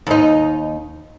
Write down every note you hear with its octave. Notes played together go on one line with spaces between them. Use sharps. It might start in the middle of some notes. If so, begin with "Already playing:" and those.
D#2 D#4